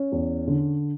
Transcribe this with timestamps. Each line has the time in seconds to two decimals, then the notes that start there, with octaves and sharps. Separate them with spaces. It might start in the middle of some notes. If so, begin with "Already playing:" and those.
Already playing: C#4
0.12 E2
0.48 D3